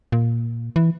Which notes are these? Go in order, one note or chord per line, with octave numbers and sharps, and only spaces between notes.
A#2
E3